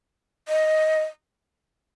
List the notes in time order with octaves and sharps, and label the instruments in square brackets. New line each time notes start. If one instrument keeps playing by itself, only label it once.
[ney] D#5